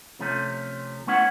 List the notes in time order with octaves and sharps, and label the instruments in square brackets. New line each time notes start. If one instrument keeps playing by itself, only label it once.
[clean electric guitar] C3 F3 A3 C#4
A3 B3 C#4 E4 F#5